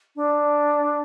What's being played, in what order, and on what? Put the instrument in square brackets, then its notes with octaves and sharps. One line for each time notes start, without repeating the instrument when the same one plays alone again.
[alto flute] D4